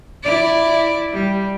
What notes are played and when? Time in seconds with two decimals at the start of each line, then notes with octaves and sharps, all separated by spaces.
0.23 E4 D5
1.13 G3